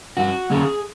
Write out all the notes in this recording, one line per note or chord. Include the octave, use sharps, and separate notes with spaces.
G2 F#4
D3 F#3 A#3 C#4 G#4